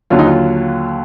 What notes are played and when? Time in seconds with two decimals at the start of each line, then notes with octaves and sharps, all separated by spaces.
0.10 D#2 D3 F#3 F4
0.19 D#4
0.26 F4